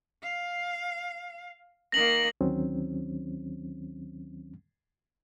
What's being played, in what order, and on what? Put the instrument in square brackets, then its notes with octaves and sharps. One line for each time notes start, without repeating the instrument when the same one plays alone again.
[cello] F5
[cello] D#3 A#3 [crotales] A#6 F#7
[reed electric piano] D2 D#3 F#3 C4 C#4